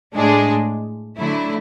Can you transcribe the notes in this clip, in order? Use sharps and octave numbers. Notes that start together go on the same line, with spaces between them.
A2 G#3 D4 G#4
D3 F#3 A3 E4